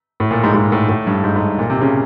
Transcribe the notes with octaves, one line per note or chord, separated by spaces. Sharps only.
A2
A#2
G#2
G#2
A2
A2
G2
G#2
G#2
A#2
C3
C#3